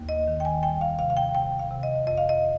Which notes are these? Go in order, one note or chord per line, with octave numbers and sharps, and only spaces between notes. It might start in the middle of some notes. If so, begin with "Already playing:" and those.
Already playing: D#2 A#3
D#5
D#3
G5
G#5
G3 G5
F5
C3 F5
F5
G5
C3 G5
F5
C3
D#5
F2 D#5
F5
D#5